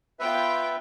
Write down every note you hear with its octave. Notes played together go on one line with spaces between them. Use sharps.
B3 F4 B4 E5 G5